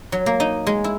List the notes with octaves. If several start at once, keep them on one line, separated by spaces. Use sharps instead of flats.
F#3
A#3
D#4
G#3
E4